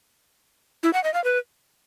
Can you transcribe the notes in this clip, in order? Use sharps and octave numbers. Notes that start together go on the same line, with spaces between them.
E4
F#5
D#5
F5
B4